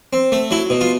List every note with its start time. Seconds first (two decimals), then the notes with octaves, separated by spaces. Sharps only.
0.13 C4
0.32 A3
0.51 F#3 E4
0.70 B2
0.81 F4